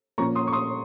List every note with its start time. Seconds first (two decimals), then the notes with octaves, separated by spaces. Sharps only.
0.18 A#2 F3 A#3 C#4 A#5 C#6
0.35 C6 D#6
0.47 C#6
0.52 C6 D#6